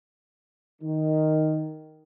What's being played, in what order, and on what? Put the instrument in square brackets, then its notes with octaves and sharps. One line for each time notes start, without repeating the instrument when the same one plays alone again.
[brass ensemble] D#3